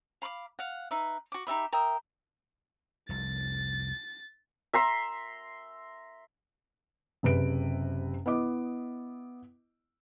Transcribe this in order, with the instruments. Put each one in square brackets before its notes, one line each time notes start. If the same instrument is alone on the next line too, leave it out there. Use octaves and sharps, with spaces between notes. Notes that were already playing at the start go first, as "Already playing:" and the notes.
[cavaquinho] F5 B5 C6 D6
F5 F#5
D#4 B4 E5
F#4 D6
D#4 G4 E5 B5
A#4 E5 G5 D#6
[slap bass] F1 C2 [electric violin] A6
[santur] E5 A#5 C6
[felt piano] F#1 C3 B4 D7
B3 E4 D#5 D6